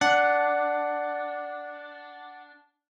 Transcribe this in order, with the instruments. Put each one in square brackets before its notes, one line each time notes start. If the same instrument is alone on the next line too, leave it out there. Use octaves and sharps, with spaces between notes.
[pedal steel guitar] D4 [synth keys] F#5